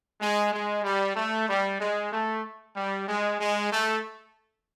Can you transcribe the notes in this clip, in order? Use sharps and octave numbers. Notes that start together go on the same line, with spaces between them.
G#3
G#3
G3
A3
G3
G#3
A3
G3
G#3
G#3
A3